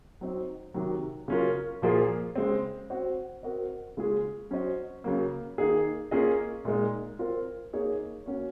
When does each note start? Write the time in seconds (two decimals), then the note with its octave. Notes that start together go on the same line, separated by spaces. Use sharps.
0.21 F#3 C4 D#4
0.74 C3 D#3 F#3
1.28 C#3 F#3 C#4 F4 A#4
1.82 A#2 F3 A#3 F4 G#4
2.35 C#3 G#3 C4
2.90 C4 F#4 C5
3.43 C4 F#4 A#4 D#5
3.97 C#3 G#3 C#4 F4 G#4
4.51 F#3 C#4 F#4 C5 D#5
5.04 C#3 F#3 A#3
5.58 D#3 A#3 D#4 G#4
6.11 A#3 C#4 F4 G#4 D#5
6.65 A#2 G#3 D#4
7.19 C4 F4 A#4
7.73 A#3 D#4 G#4 C#5
8.26 A#3 C#4 F#4 A#4 C#5